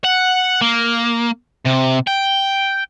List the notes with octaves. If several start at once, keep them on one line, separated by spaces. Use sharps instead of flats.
F#5
A#3
C3
G5